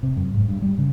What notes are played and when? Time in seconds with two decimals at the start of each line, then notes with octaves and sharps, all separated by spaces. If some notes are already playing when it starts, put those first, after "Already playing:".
0.03 C3
0.17 F#2
0.34 G#2
0.48 G2
0.62 G3
0.78 C#3